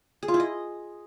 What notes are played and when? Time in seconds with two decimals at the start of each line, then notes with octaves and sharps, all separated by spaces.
0.23 G#4
0.28 F4
0.34 E4
0.40 D#5